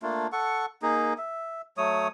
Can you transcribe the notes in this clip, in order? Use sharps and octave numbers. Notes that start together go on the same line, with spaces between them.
A3 A#3 D4 F4
A4 F#5 C#6
A#3 D#4 G#4
E5
F#3 A3 C#5 D#6